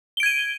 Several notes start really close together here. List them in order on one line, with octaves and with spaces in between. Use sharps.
G7 D7 G#6 D#7